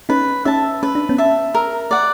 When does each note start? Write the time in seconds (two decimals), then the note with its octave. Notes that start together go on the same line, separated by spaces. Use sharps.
0.09 C#4 D#4 B4
0.45 C#4 D#4 E5 A5
0.83 C#4 B4
0.95 D4
1.09 B3 C#4
1.18 E5 A5
1.55 A#4
1.91 D5 F#5